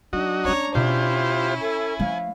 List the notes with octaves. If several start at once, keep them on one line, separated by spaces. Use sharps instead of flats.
F#3 D4 D#4 F#4 D#5
A3 C#4 C#5 A#5
B2 C#4 E4 F4 G4 C5
A4 G#5
F3 A3 F5